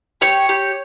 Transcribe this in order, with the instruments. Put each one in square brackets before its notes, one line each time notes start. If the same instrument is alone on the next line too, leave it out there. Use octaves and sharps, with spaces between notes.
[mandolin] G4 C#5
G4